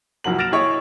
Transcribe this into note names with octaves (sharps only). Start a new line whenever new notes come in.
C2 F2 F#3 F#4 A#4 F#7
F6 A6 A#6 D7 E7 F7
E4 G#4 C#5 D#5 C#6